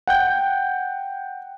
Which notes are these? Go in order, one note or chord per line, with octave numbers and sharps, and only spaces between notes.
F#5 G5 G6